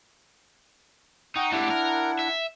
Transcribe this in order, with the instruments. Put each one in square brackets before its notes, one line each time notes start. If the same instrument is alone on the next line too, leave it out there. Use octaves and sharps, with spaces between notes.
[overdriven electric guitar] D#4 [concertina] F#5 G5 C#6
[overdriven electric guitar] A3 G4 [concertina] D4 E4 F#5
[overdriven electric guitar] A#4
E5